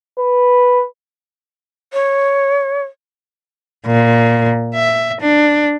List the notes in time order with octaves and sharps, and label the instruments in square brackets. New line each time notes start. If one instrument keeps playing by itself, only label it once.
[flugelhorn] B4
[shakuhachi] C#5
[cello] A#2
E5
D4